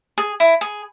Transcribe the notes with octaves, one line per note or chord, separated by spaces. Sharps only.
G#4
E4
G#4